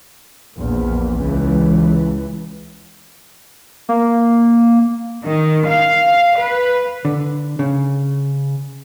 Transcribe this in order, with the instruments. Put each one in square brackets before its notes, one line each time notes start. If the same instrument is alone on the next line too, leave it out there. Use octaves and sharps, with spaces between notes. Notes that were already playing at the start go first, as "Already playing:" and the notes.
[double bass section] A#1 E2 A#2
C#2 E3
[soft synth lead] A#3
[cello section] D#3
F5
B4
[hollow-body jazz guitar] D3
C#3